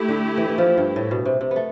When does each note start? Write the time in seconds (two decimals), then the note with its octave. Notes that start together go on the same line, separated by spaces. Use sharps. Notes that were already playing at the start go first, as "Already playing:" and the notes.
Already playing: A3 E4 G4
0.09 D3
0.38 E3
0.49 E3
0.58 F3
0.78 G2
0.96 A2
1.11 B2
1.25 C3
1.41 C3
1.51 B3
1.56 A3